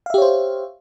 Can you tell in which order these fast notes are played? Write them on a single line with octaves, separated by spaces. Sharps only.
F5 E5 G4 C#5 C5